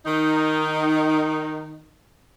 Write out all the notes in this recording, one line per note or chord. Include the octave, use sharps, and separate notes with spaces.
D#3 D#4